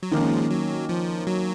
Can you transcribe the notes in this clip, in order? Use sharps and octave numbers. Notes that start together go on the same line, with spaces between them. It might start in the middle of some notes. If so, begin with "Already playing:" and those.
F#3
D#3 F3 G#3 A#3 C#4
F#3
F3
F#3